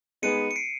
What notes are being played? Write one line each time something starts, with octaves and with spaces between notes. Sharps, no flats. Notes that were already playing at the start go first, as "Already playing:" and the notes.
G#3 B3 D#4 G#4 B4 C#7 D#7
C#7
C7 D7